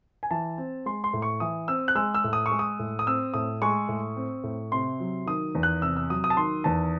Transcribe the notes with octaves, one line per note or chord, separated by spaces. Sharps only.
G#5
E3 A5
C4
G#3 C6
C6
A2
C#6
E3 D#6
C4 E6
F#6
G#3 E6
E6
A2
D#6
C#6
G#3
D#6
A2
D#6
C4 E6
A2 D#6
G#3 C#6
A2
C4
A2
C3 C6
F#3
D#3 D#6
E2
F#6
C3 E6
E6
F#3 D#6
D#6
A5
D#3 C6
E2 A5